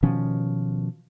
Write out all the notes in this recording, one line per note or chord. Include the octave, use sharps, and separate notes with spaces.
B2 D#3 F3 C#4